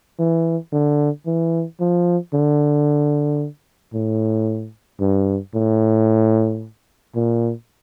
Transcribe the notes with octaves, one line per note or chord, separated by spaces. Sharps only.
E3
D3
E3
F3
D3
A2
G2
A2
A#2